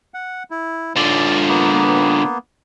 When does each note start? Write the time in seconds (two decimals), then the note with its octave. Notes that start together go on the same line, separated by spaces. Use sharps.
0.14 F#5
0.51 E4
0.96 D3 F4 D5
1.48 A#3 B3